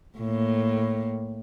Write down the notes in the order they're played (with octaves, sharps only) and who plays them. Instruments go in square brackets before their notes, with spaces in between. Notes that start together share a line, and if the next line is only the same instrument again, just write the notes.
[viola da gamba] A2 A#3